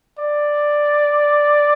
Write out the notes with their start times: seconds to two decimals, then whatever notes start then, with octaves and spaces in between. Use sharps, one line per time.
0.19 D5